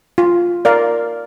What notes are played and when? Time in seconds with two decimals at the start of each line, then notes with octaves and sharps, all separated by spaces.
0.18 F4
0.65 A#4 D5 F5